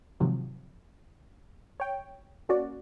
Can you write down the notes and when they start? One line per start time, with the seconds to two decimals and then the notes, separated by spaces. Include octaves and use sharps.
0.20 G#2 C3 D#3 F3 F#3
1.80 C#5 G5
2.49 A#3 C#4 F#4 D5